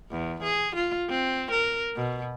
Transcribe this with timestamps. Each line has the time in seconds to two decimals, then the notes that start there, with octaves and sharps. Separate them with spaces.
0.11 E2
0.43 G#4
0.76 F4
1.09 C4
1.51 A#4
1.96 B2